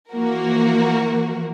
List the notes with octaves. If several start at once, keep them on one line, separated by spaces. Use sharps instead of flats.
E3 F3 A#3 F#4 A#4